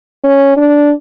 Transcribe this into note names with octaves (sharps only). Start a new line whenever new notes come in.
C#4
D4